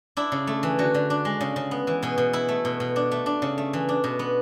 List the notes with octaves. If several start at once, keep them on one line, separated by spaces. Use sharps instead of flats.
D4 E4
C#3
A3
E3
D3 F#4
D3
D4
G#3
C#3
C#3
B3
E3
B2 G#4
B2
E4
A3
B2
B2
D4
A3
D4
C#3
A3
E3
D4
B2
B3